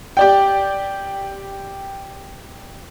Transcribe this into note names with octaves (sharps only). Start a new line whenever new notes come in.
G4 D5 G5